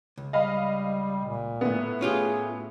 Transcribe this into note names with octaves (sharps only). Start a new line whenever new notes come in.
C#2
G3 D#5 F5 B5
A#2
A2 B3
C#4 F4 G4 G#4